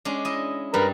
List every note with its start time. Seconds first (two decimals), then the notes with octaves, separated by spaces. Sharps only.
0.05 G#3 C#4 D4
0.25 E4 D#5
0.74 G2 G3 A#4 B4 A#5